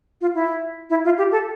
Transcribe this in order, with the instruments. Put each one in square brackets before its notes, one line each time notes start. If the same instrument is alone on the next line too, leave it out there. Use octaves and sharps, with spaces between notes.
[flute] F4
E4
E4
F4
G4
A4